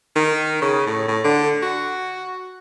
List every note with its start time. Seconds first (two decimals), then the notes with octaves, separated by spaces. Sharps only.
0.16 D#3
0.62 C#3
0.86 A2
1.08 A2
1.24 D3
1.62 F#4